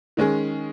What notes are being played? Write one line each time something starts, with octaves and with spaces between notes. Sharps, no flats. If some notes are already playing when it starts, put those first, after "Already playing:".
D#3 G#3 C#4 G#4